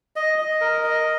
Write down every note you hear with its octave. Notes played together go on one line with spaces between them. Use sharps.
D#5
D#5
A#4
D#5